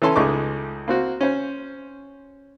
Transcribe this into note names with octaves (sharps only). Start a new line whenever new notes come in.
E3 C#4 A4 C6
C#2 G#3 A3 D#4 C#6 D6
A#3 C4 F#4
C#4 C5